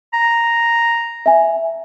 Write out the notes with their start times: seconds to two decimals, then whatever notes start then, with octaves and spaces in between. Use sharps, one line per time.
0.13 A#5
1.26 E5 G#5